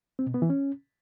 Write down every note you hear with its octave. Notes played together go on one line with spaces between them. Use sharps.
C4
B2
B3
E3
C#4